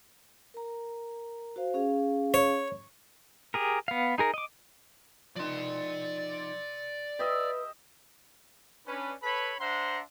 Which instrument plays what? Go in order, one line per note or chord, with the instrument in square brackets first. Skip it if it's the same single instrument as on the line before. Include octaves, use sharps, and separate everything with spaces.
[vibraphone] A#4 A#5
F#4 C5 F5
C#4 G#4 F5
[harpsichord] C#5
[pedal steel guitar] G4 G#4 A#4
B3 F5
D#4 G#4 A#4
D#5 D6
[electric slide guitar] F3 D#4 [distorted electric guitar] D5 C6
[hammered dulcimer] G4 D#5 E5 [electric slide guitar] B4
[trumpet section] C#4 D4 B4
A4 B4 C#5 A5 B5
D4 C5 E5 F#5 A#5 C6